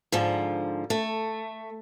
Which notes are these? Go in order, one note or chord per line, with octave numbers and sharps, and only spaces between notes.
G#2 D3 F3
A3